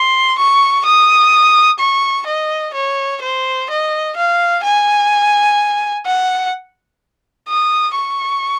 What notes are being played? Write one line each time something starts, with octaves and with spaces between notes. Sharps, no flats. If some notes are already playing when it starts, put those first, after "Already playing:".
Already playing: C6
C#6
D#6
C#6
D#5
C#5
C5
D#5
F5
G#5
F#5
D#6
C#6